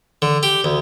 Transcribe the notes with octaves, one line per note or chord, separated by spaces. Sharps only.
D3
G4
D2